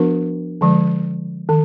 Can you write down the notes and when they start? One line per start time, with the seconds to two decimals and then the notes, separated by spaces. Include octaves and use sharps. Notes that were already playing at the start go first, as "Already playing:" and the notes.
Already playing: F3 B3 D4 F#4 A#4
0.61 D3 F3 G#3
1.49 D#3